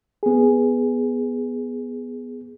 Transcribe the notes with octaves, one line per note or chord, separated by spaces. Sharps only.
B3 G#4